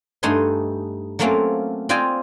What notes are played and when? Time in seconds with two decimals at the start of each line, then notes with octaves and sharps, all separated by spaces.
0.23 G2 A3 D#4 F#5 G#5 C6
1.19 F#3 A3 A#3 C4 C#4 F4
1.89 C4 F4 D5 D#5 G5 G#5